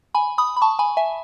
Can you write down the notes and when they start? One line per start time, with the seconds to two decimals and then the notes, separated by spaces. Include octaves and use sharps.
0.14 G#5 B5
0.38 B5 D#6
0.57 B5
0.62 A5 C#6
0.79 G#5 B5
0.97 E5 G#5